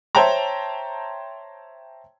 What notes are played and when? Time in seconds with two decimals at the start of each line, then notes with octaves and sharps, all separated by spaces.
0.15 C5 C#5 E5 G5 A5 A#5